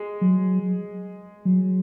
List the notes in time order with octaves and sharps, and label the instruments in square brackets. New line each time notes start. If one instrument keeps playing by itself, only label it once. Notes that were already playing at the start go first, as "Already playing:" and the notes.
Already playing: [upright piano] G#3
[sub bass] F#3
F#3